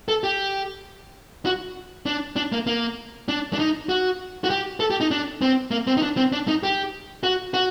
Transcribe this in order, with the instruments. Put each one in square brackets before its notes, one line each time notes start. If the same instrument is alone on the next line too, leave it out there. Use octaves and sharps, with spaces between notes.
[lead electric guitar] A4
G4
F#4
D4
D4
A#3
A#3
D4
D4
D#4
F#4
F#4
G4
A4
G4
D#4
D4
C4
A#3
C4
D#4
D4
C4
D4
D#4
G4
F#4
F#4